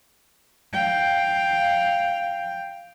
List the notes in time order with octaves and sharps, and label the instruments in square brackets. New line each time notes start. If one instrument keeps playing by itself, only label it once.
[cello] F5 G5